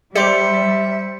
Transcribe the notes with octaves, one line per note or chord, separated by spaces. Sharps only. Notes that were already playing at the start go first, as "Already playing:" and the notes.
G3 G4 C5 D5 E5 C6 C#7